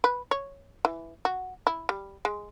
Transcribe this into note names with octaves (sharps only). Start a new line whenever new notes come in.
B4
C#5
E3
F#4
E4
G3
G#3